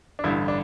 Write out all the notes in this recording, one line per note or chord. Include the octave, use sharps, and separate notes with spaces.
D4
A1 G2 D3 E4
D4